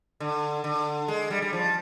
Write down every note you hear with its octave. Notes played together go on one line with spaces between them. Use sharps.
D3
D3
G#3
G3
G3
F3